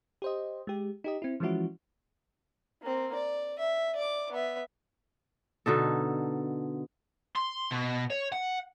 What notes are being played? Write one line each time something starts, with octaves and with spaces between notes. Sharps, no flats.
G4 C5 D#5
G#3 G4
D#4 G4 D#5
C4 E4
E3 F3 G#3 C#4 E4 F#4
A#3 C4
D5
E5
D5 D6
B3 E5
B2 D3 D#4 A4
C6
B2
C#5
F#5